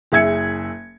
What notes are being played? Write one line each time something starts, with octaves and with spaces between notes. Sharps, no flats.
F#1 G#4 E5 G#6 C#7